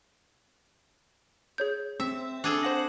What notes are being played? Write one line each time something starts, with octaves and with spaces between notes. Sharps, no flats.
G#4 C#5 G6
C4 E5
D4 G#4 A4
C5 F#5 A#6 F#7